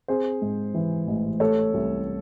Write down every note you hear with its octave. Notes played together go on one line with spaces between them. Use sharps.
C4 G#4 C5
G#2
E3
A1
A3 A4 C#5
C2